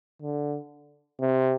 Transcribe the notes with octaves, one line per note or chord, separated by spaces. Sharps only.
D3
C3